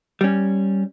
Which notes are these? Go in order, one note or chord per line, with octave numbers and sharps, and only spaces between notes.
G3 C#4